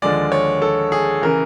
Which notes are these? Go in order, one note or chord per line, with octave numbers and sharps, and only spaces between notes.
D#2 D3 F3 G#3 D5
C#5
A4
G#4
C#3 E3 A#4